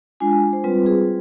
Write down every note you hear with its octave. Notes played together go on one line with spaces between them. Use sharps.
G#3 D4 F4 G#5
G#5
C5
G3 C4 F4 B4
G#4